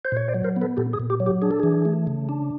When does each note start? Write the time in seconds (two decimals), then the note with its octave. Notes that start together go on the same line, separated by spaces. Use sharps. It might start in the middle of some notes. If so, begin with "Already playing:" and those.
0.05 C5
0.12 A#2 C#5
0.28 C5 D5
0.34 F#3
0.44 A#4 C5
0.56 B3
0.62 A4 B4
0.77 A#2 G4 A4
0.93 G#4
1.00 A#2
1.10 G4
1.20 F#3
1.26 G4
1.42 D4 G#4
1.51 A4
1.60 E3 G#4
1.85 A3
2.07 C#3
2.29 D4